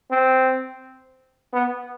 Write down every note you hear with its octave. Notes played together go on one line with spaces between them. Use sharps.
C4
B3